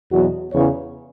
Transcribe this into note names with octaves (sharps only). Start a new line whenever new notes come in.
E2 B2 F#3 F#4
E2 C#3 E3 C#5